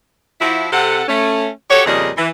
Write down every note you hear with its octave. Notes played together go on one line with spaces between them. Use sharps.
F3 E4 F#4
C3 A4 F#5
A3 C#4
F#4 G4 A4 C#5
F2 A#2 C#3 G3 G#4 D#5
E3